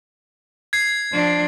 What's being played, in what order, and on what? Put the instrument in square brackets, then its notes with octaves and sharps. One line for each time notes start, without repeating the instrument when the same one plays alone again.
[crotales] G#6 C7
[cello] F3 D4